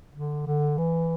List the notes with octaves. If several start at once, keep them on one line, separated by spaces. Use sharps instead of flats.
D3
D3
E3